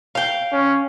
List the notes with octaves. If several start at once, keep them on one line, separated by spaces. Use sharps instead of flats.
F5 G5
C#4